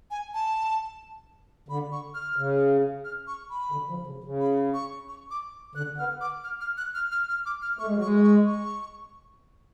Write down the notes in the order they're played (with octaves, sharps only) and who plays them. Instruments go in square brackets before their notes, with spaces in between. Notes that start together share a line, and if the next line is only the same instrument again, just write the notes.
[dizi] G#5
A5
[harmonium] D3 [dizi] B5
[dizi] C#6
F6
[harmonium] C#3
[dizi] F6
C#6
B5
[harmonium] D3
F3
C#3
C#3
[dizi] B5
C#6
C#6
D6
[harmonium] D3 [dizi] F#6
[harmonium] B3 [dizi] F6
[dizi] D6
F6
F6
F#6
F6
F6
F6
D6
F6
[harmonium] A3 [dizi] C#6
[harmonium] G#3
F#3
[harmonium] G#3 [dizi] C#6
[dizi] C#6
C#6